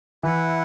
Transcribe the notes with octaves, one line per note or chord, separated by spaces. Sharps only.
E3 E4 B4 F#5